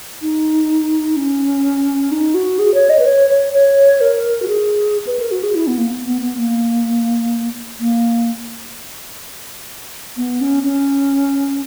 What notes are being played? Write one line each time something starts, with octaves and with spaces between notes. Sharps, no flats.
D#4
C#4
D#4
F#4
G#4
C#5
D#5
B4
C#5
C#5
C#5
A#4
F#4
G#4
B4
A#4
F#4
G#4
E4
B3
A#3
B3
B3
B3
A#3
A#3
B3
C#4
C#4